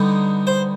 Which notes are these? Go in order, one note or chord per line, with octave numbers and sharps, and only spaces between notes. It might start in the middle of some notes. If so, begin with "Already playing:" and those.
Already playing: D3 G3 B3 D#4
C5